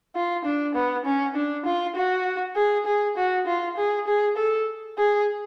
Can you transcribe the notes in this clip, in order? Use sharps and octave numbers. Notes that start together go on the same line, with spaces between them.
F4
D4
B3
C#4
D4
F4
F#4
G#4
G#4
F#4
F4
G#4
G#4
A4
G#4